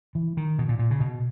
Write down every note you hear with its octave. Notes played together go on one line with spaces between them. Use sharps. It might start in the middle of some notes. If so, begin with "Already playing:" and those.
E3
D#3
B2
A#2
A#2
C#3
B2